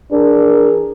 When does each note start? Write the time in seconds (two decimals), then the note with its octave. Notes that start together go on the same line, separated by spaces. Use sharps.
0.12 E3 D4 G#4 A#4